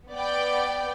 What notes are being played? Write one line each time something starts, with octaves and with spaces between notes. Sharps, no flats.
B3 D5 G5